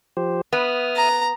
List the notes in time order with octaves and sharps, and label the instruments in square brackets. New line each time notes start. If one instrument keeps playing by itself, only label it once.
[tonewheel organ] F3 G4 C5
[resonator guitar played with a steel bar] B3 [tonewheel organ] E5 D#6 F6
[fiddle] A#5